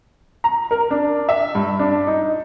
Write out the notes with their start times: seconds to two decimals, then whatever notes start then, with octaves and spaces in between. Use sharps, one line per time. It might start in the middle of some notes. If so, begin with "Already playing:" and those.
0.44 A#5
0.71 A#4
0.91 D4
1.29 E5
1.55 G2
1.79 D4
2.07 D#4